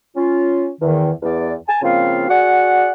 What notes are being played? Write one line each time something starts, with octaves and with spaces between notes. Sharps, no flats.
C#4 F4
E2 D#3
E2 D5
G#5 A5
C#3 F3 A#3 C4 F4 F5
F#4 G#4 D5 F#5